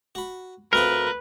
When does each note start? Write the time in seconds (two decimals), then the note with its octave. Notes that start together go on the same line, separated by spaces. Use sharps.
0.15 F#4 B5
0.73 D2 C4 F4 A#4 B4